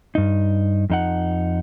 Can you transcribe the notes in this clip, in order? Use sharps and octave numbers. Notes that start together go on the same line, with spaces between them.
G2 D#4
F2 D#4 F#5